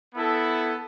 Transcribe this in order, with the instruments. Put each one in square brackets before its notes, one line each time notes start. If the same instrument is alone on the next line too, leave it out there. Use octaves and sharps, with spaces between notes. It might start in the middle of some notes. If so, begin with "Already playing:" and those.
[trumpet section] B3 E4 A4